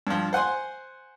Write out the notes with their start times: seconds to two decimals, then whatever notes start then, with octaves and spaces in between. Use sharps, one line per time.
0.07 G2 F3
0.33 C5 F#5 G#5 C6